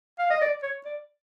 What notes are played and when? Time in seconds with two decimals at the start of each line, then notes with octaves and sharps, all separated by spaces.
0.19 F5
0.30 D#5
0.41 D5
0.63 C#5
0.85 D5